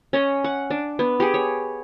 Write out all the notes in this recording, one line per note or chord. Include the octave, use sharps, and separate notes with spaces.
C#4 C#5 D#5
F#5
D4
B3
G4 G#4
C#5